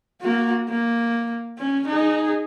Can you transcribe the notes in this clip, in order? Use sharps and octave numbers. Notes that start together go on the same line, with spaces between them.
A#3 F#4
A#3
C#4
D#4 G#4